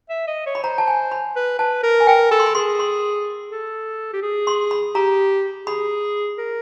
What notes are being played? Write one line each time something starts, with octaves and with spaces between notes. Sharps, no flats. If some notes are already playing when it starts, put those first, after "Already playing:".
E5
D#5
C#5
B5
C5 A#5
A5
G#5
B5
B4
B4 A5
A#4
G#5
A#4 G5
A4 B5
C6
B5
G#4 C6
C6
A4
G4
G#4
C6
B5
G4 A#5
G#4 B5
A#4